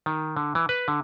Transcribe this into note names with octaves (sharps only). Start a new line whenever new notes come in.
D#3
D3
E3
B4
D3